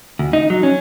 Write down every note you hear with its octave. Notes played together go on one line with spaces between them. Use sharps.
D2
D#4
F#3
C#4